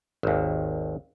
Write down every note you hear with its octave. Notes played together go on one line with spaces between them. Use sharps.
G#1 D#2